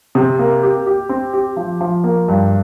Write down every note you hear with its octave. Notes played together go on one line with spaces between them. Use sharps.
C3
A#3
G4
G4
C4
G4
F3
F3
A#3
G2